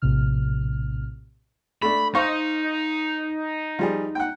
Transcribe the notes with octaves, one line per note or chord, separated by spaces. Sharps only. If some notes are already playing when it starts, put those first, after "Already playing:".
A#1 A2 C3 F6
A3 D4 B5
D#4 C5 F5 C#6
F3 G3 G#4
F#5 G5